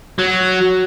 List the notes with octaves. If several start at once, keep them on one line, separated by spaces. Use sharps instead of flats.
F#3